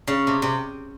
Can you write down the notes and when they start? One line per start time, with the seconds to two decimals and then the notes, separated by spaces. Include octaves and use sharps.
0.07 C#3
0.27 C3
0.42 C3